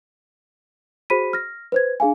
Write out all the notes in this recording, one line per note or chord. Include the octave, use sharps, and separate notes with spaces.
F#4 G#4 C5 B5 B6 D#7
F6 A#6
B4 C5 G#6
D4 G#4 F5 G#5